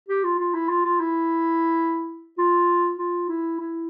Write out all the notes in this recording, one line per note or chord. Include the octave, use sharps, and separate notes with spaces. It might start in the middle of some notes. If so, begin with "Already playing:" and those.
G4
F4
F4
E4
F4
F4
E4
F4
F4
E4
E4